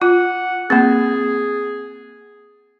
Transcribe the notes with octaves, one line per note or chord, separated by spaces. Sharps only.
F4 F#5
A#3 C4 G#4